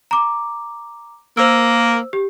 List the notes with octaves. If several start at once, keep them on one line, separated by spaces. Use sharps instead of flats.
A#5 D6
A#3 C5 E6
G4